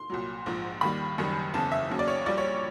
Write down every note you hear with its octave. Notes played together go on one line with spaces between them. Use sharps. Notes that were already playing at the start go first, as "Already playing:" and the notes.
Already playing: C6
C2 A#2 F#3
A#1 G#2 F3
D#2 D#3 G3 B5
F#1 F#2 D#3 G3
F#1 E2 C#3 A5
E5
D#2 C#3 F#3
D5
C#5
A#1 A#2 G3 D5
C#5